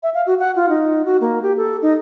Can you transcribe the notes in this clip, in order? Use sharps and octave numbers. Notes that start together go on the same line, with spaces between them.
E5
F5
F#4
F#5
F4
D#4
F#4
A#3
G4
A4
D#4